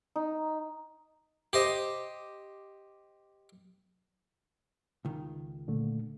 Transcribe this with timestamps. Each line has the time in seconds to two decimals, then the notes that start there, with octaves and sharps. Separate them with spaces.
0.16 D#4
1.53 G4 C5 D#5
5.05 C#2 D#3
5.68 A#2 D3 A3